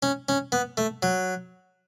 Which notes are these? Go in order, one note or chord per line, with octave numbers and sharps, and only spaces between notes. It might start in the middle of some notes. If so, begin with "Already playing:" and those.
C#4
C#4
B3
A3
F#3